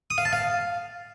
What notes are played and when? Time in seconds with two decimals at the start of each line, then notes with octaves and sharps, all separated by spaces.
0.10 D#6
0.18 F5
0.25 A5
0.33 F5